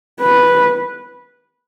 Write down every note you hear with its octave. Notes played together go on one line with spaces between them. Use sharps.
B4